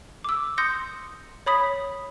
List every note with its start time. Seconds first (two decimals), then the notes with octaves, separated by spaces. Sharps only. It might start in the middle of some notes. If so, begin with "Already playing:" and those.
0.24 D6 E6
0.58 C6 D#6 G6 A#6 C#7
1.46 C#5 B5 D#6 B6